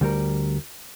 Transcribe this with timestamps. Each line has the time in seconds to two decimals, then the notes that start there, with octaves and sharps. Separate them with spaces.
0.01 D2 G3 A#4